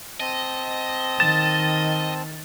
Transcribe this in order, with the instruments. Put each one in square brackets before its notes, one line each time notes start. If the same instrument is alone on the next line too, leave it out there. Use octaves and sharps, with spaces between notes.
[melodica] C4 A5 [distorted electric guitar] D#5
[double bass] D#3 [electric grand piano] A6 E7